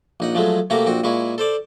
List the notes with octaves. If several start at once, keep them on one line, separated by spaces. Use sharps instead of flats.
A#1 D#4 F#5
F3 F#3 G#3 A3
C3 A3 A#3 F#4 A#5
A#1 C4 F#4
A#2 G#3 E4 C#6
A4 C5 D5